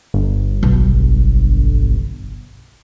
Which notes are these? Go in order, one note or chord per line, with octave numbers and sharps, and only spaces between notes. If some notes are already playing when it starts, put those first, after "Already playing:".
G1
B1